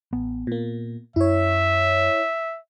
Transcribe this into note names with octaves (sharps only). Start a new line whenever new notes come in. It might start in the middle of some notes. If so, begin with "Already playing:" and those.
A1 B3
A#2 A#3
F#2 E4 C#5 E5